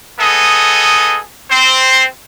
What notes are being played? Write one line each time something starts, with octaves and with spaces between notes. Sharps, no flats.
B3 G#4 A4 D#5
C4 C5